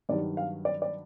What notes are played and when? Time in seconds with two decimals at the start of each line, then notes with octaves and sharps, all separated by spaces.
0.09 G2 D#3 F#3 D5
0.37 F5
0.65 D5
0.82 D5